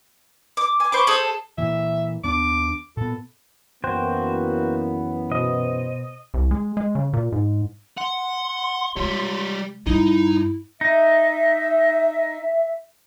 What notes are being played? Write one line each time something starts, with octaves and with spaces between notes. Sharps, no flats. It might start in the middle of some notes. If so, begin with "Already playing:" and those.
D6
G#5 D6
C5 B5 C#6 D6
G#4 A4 C5 D#6
A#2 E3 E5
D#2 B3 D4 D6
A#2 B3 A4
F#2 E3 A#3 B3 F#4 C5 G5
B2 C5 D#5
C2
G#3
G#3
C#3
A#2
G#2
F#5 C6
C3 G3 G#3 C#5
G2 G3 D#4 E4
D#4 E5